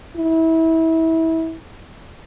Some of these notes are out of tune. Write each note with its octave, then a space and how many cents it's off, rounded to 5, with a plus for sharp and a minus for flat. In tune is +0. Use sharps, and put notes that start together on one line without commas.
E4 -25